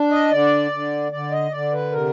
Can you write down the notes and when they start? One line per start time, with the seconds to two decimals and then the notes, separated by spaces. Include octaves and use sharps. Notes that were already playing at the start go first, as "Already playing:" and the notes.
Already playing: D4
0.11 D#5
0.31 D3 D5
0.71 D3
1.12 D3 D5
1.31 D#5
1.51 D3 D5
1.73 B4
1.92 C3 A#4